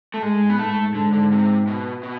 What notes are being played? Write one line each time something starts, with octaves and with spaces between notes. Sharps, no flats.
A3
G#2 G#3
B3
G#2 A3
G#2 D3
D3
C3
B2
B2